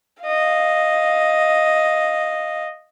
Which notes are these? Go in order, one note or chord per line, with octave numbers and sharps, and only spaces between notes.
D#5 F5